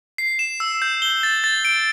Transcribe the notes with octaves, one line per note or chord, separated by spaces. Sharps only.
C7
E7
E6
G6
G7
A6
A6
D7